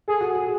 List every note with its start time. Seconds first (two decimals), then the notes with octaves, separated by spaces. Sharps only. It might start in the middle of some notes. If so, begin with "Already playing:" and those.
0.08 G#4 A4
0.21 F#4
0.35 G#4